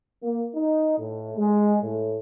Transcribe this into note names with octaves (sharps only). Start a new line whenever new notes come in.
A#3
D#4
A2
G#3
A2